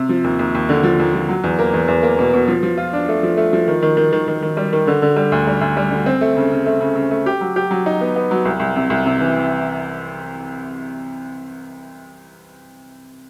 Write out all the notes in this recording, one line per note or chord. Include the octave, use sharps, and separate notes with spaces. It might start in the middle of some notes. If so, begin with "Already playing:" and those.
Already playing: C3
F3
D#2
D#2
D#2
D3
F3
D#2
F3
F#3
E2
A#3
E2
E2
A#3
B2
B2
F3
F3
F4
D4
A3
F3
A3
F3
D#3
D#3
D#3
D#3
D#3
D#3
G3
D#3
D3
D3
G3
D2
G3
D2
G3
D3
C4
A3
C#3
C#3
A3
C#3
C#3
A3
G4
F#3
G4
F#3
D#4
B3
B3
F#3
C2
C2
C3
C2
C3
E3